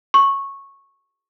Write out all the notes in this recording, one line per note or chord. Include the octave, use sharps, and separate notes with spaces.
C#6